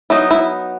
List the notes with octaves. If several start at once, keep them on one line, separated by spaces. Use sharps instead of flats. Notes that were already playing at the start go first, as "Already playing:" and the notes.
F#3 B3 D#4 E4
E4